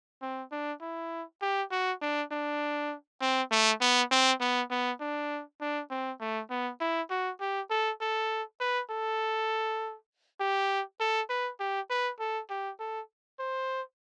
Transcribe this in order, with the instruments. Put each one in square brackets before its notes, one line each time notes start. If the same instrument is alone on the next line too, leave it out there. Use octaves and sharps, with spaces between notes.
[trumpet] C4
D4
E4
G4
F#4
D4
D4
C4
A3
B3
C4
B3
B3
D4
D4
C4
A3
B3
E4
F#4
G4
A4
A4
B4
A4
G4
A4
B4
G4
B4
A4
G4
A4
C5